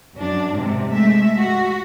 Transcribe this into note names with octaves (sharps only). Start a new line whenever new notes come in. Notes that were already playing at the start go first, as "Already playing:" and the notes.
F#2 D4
G#2 C3
G#3 A3 E5
F#4